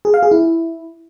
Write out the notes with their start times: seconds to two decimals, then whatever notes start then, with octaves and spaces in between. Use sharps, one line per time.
0.05 G#4
0.14 F5
0.23 G#4
0.31 E4